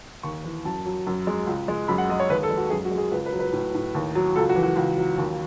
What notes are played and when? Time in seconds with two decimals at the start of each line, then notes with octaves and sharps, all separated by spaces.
0.23 D#2 C#6
0.44 E3
0.65 F#2 A5
0.86 F#3
1.07 F#2
1.27 G#3
1.47 C#2
1.68 G#3
1.88 F#2 B5
1.98 F#5
2.09 G#3 D#5
2.20 C#5
2.29 D#2 B4
2.43 A4
2.51 G#3
2.57 F#4
2.70 F#2 G#4
2.85 F#4
2.91 G#3
2.98 G#4
3.12 C#2 B4
3.26 B4
3.32 F#3
3.39 B4
3.53 A2
3.74 A2
3.95 D#2
4.15 F#3
4.36 C#2 A4
4.49 F#4
4.56 E3
4.63 F#4
4.76 C#2
4.97 F#3
5.18 D#2